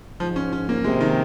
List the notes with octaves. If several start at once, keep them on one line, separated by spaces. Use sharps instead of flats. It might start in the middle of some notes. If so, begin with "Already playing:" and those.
G#2 F3
C#4
C#4
A#3
C3 G#3
D#3